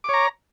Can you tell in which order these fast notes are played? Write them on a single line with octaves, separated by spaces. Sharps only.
D6 C#5 A#5